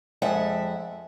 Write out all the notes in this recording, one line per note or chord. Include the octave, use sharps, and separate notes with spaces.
F2 G#3 E5 F#5